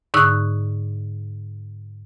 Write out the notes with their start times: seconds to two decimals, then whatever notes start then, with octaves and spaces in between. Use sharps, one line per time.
0.14 G#2 D3 D#4 C#6 E6 F#6